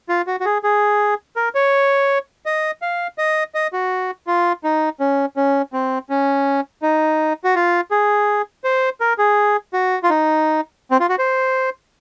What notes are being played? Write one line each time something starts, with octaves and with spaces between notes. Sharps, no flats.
F4
F#4
F#4
G#4
G#4
A#4
C#5
D#5
F5
D#5
D#5
F#4
F4
D#4
C#4
C#4
C4
C#4
D#4
F#4
F4
G#4
C5
A#4
G#4
F#4
F4
D#4
C4
F4
F#4
C5